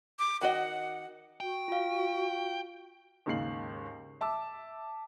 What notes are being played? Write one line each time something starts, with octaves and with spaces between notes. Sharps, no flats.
D6
D#3 F#4 D#5 F#5
F#4 G5
F4 F5
D#2 G#2 C#3 F5 C7 F#7
E5 A5 D6 E6